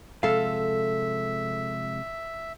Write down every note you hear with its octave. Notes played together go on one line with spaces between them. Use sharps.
C3 F3 G#3 A4 E5 F5